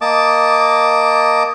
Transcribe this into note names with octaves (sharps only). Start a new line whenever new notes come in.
A#3 D#5 A5 D6